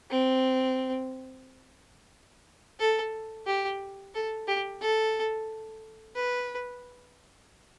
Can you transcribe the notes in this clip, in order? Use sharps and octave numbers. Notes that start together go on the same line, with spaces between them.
C4
A4
G4
A4
G4
A4
B4